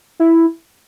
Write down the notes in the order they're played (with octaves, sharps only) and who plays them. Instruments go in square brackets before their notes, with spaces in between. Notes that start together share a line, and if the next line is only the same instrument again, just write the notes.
[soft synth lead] E4